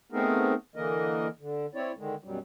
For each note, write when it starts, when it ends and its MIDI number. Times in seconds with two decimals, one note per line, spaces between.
0.12 0.54 57
0.12 0.54 59
0.12 0.54 60
0.12 0.54 63
0.12 0.54 68
0.12 0.54 70
0.76 1.28 50
0.76 1.28 52
0.76 1.28 58
0.76 1.28 70
0.76 1.28 75
1.40 1.66 50
1.75 1.92 60
1.75 1.92 64
1.75 1.92 73
1.75 1.92 74
1.98 2.15 50
1.98 2.15 51
1.98 2.15 56
2.24 2.39 42
2.24 2.39 47
2.24 2.39 54
2.24 2.39 55